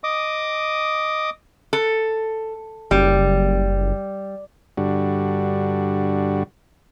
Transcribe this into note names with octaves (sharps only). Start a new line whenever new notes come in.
D#5 D6 D#6
A4
F#1 G3
G2 D3 G3 F#4